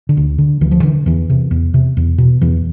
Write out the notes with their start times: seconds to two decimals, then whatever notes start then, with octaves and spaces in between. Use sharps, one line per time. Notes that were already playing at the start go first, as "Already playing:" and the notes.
0.09 D3
0.17 D2
0.38 D3
0.61 D2 E3
0.71 F3
0.83 D3 E3
1.06 E2 E3
1.30 C3
1.51 E2
1.74 C3
1.97 E2
2.18 B2
2.41 E2 E3